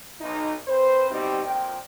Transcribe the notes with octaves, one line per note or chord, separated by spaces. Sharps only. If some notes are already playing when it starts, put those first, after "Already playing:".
B1 D#4
C4 B4 C5
B2 G3 C4 D#4 G4
F2 A#2 G5